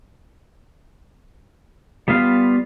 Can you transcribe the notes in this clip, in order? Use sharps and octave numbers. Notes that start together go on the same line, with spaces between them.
G3 B3 F4 F5